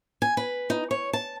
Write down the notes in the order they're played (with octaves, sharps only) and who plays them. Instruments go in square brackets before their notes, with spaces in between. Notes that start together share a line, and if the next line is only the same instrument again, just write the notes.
[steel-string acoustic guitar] G#5
B4
D#4
C#5
A5